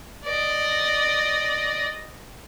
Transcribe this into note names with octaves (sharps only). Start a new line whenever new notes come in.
D5 D#5